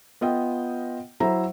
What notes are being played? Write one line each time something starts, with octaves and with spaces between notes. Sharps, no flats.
B3 F4 D#5 G5
F#3 E4 C5 E5 A#5